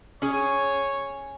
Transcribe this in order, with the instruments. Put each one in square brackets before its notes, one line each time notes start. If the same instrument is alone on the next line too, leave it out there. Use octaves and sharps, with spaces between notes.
[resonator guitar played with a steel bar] C#4 G#4 [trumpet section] C#5